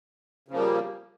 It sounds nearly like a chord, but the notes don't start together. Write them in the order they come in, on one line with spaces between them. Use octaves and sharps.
C#3 F3 A#3 G3